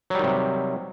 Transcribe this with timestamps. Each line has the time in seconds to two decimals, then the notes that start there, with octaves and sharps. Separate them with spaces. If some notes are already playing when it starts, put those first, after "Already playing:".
0.10 F#3
0.15 G3
0.19 D#3
0.23 C3